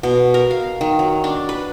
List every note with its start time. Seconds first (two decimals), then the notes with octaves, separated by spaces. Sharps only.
0.03 B2
0.34 A#4
0.51 F5
0.81 D#3
0.99 F#3
1.24 D4
1.49 B4